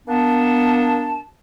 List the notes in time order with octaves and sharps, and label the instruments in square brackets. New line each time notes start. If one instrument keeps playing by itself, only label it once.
[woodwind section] A#3 B3 D4 A5